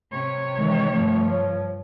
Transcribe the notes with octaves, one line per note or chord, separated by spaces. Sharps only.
C3 C#5
D#3 E3 G#3
G2 F3 A3
C#5